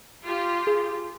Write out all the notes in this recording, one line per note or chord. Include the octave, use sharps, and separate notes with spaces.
F4 G4
G#4